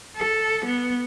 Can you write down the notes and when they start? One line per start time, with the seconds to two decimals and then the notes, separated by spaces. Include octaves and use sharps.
0.17 A4
0.65 B3